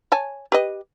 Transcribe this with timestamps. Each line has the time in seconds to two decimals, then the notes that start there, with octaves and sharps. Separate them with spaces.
0.12 C#5 G#5 A5
0.52 G4 B4 D#5